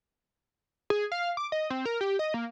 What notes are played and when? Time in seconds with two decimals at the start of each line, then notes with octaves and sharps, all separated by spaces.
0.90 G#4
1.12 F5
1.37 D6
1.52 D#5
1.70 C4
1.85 A#4
2.01 G4
2.19 D#5
2.34 A#3